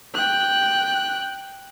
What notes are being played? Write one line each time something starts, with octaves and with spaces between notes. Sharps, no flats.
G5 F#6